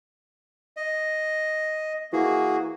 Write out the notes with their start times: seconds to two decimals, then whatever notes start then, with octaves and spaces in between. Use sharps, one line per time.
0.77 D#5
2.13 E3 A#3 F#4 G#4